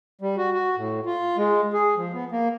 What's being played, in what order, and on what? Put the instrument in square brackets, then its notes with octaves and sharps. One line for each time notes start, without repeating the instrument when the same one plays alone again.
[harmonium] G3
F#4
F#4
A2
F4
G#3
G#4
F3
B3
A#3